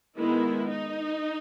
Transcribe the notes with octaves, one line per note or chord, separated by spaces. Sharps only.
D#3 G#3 B3 E4
D#4